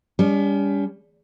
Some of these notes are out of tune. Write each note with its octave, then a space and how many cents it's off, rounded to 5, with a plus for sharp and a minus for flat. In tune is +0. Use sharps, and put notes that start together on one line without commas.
G3 +30 C#4 +45